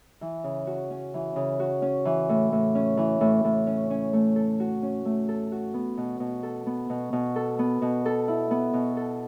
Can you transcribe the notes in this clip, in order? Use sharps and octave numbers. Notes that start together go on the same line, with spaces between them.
E3
C#3
F#4
C#4
E3
C#3
F#4
C#4
E3
A2
A2
C#4
E3
A2
A2
C#4
C#4
A3
A4
F#4
C#4
A3
A4
F#4
B3
B2
B2
A4
B3
B2
B2
A4
B3
B2
A4
E4
B3
B2
A4